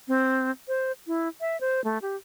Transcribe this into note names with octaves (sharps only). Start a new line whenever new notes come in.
C4
C5
E4
E5
C5
A3
G4